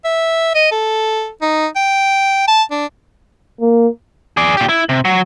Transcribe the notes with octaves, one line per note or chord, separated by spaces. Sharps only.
E5
D#5
A4
D#4
G5
A5
D4
A#3
G#4 D5
A#2 G4
E4
C3
F#3